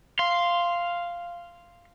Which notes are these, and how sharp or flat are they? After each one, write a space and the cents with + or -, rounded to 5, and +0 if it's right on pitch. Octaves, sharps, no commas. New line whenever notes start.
F5 -10 C6 +0